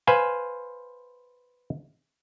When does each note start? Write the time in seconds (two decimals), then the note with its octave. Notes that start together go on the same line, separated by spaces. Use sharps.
0.07 B4 C5 F5 G#5